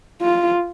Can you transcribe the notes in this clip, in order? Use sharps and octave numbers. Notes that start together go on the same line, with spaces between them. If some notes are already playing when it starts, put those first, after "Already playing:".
F4